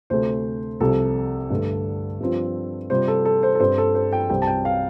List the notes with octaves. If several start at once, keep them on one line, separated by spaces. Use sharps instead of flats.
D2 C3 A3 C5
C2 C3 F3 A4
G2 D3 A3
G2 F3 C4 F4
C3 G3 F4 C5
A4
A4
C5
A4
G2 G3 C4 C5
A4
C5
G5
C2 C3 G3 C4 G5
A5
G5
F5